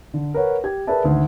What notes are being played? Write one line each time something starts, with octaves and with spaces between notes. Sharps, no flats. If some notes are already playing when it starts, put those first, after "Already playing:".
D3
A#4 B4 C#5 F#5
G4 G#6
G#4 A#4 B4 D5 E5 A5
G#1 D2